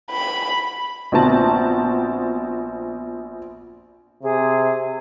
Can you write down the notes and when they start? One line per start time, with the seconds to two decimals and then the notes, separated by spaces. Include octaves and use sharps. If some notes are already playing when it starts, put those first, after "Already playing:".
0.11 B5
1.12 A#1 B3 C4 F#4 A5 A#5
4.23 C3 G#4